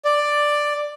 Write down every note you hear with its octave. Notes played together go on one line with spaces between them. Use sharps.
D5